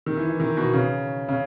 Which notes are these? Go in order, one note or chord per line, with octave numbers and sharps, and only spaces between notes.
D#3
E3
E3
D#3
B2
C#3
C#3